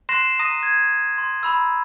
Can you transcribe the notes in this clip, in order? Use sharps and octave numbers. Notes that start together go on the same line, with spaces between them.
C6 F#6 A#6 C7 E7
A#5 D#6 A#6 D#7
G#6
C6
A#5 B5 E6